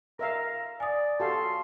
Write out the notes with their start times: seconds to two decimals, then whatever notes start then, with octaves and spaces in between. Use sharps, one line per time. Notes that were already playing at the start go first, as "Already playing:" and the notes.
0.19 A#4 E5 F5 A#5
0.80 D5 G#5 D#6
1.20 F#4 G4 A4 F5 C6